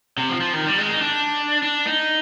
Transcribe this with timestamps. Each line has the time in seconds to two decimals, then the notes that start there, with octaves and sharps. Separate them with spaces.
0.18 C3
0.29 F3
0.41 F3
0.53 D#3
0.66 G3
0.78 G#3
0.90 D#4
1.02 D4
1.63 D4
1.87 D#4